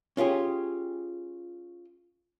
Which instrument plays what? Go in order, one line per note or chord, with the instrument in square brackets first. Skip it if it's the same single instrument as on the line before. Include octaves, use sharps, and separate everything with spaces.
[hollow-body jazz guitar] C#4 F4 G4 G#4